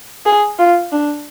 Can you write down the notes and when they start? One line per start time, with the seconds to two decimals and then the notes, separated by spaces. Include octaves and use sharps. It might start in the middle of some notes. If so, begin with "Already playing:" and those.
0.25 G#4
0.58 F4
0.91 D4